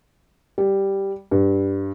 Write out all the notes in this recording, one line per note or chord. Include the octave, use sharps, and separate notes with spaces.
G3
G2